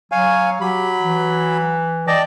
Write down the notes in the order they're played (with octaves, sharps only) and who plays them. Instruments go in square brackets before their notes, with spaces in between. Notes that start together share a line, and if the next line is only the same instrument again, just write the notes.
[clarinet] F#3 [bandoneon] C#5 F5 G#5
[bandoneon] F#3 B5 [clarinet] G4
[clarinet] E3
[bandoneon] D5 G5 A5 [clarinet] D#5